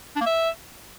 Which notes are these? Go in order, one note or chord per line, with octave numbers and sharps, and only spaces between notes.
D4
A#3
E5